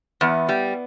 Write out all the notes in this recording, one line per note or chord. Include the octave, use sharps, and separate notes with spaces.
E2 B3
G3